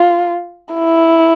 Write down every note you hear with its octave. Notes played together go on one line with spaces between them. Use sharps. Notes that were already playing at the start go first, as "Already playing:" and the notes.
Already playing: F4
E4